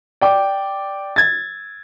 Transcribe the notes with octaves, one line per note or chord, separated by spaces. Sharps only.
D5 G5 D6
G#6 A6